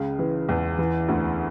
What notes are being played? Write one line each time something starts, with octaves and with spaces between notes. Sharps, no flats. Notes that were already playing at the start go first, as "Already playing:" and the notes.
Already playing: C#2 C#3
E3
E2
E3
D2